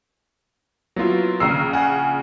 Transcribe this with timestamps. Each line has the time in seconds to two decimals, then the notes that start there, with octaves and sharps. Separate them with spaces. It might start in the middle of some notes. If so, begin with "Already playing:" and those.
0.96 F#3 A#3 B3 E4 F4
1.40 A#1 C#3 A#5 E6 C7
1.73 F#5 G#5